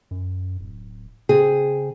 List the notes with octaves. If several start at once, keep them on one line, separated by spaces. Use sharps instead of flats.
F#2
D1
C#3 C4 G#4